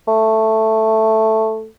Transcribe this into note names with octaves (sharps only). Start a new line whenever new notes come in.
A3